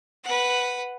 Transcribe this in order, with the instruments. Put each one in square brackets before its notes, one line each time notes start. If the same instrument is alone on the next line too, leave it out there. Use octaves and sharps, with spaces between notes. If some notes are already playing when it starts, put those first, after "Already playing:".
[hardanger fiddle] B4 F#5